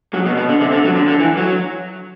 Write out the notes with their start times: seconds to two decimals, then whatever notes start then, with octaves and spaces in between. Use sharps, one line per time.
0.14 F#3
0.26 B2
0.37 B2
0.49 D3
0.61 C3
0.72 D3
0.85 F#3
0.95 D3
1.08 D3
1.20 E3
1.37 F#3